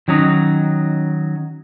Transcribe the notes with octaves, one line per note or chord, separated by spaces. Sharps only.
D#3 F#3 C#4 D#4